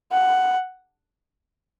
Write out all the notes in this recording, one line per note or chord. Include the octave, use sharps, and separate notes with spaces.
F#5